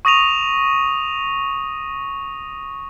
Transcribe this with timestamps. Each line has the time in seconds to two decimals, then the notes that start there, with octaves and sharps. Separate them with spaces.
0.05 C#6 D#6 A#6 D#7 F7